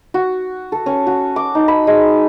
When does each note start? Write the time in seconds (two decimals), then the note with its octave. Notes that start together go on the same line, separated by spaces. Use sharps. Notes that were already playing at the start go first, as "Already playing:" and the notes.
0.14 F#4
0.72 A4
0.86 C#4
1.07 F#4
1.36 D6
1.55 D#4
1.68 B5
1.87 G#3